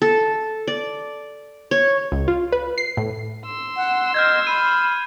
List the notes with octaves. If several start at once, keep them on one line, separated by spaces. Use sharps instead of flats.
A4
D5
C#5
C#2
F4
B4
C7
A2
C6 E6
F#5
D#5 F6 G6 G#6
B5 D#7